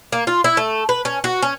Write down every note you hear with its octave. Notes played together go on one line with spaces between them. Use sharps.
A#3
F4
E4
A3
B4
C#4
F#4
C#4